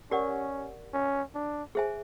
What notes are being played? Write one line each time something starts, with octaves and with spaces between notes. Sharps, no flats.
C#4 G4 A#4 D5 F#5
C#4
D4
G#4 C5 E5 G#5